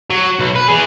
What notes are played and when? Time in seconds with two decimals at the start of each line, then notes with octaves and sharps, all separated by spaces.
0.10 F#3
0.39 B1
0.55 B4
0.68 E3 G#4